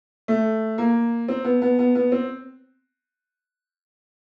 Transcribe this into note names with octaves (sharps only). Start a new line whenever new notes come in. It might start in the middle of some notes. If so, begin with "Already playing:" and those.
A3
A#3
C4
B3
B3
B3
B3
C4